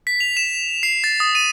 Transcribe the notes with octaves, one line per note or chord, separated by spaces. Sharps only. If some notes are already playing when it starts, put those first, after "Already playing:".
B6
F7
E7
C7
A6
D#6
D#7